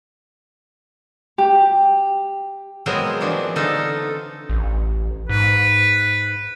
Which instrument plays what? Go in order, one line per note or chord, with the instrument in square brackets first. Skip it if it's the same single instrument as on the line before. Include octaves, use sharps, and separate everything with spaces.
[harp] G4
[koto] F#3 G#3 B3 C4 G#4 A#4
E3 F3 D4 F#4
D3 D#4 F4 A4
[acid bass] A1
[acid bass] G#2 [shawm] B4